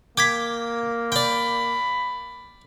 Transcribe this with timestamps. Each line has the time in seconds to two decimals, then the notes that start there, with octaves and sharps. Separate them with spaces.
0.17 A#3 G5 D6 G#6 B6
1.12 D5 G5 B5